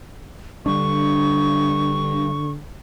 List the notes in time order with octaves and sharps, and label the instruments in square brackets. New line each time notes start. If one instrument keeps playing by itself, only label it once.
[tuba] D3 [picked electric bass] G3 D4 [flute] C#6